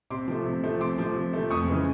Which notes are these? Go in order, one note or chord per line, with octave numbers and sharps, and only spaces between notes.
C3 C6 D6
F3 A3
C3
F3 A3
C3 C6 D6
F3 A3
C3
F3 A3
F2 C#6 D#6
C#3 E3 G#3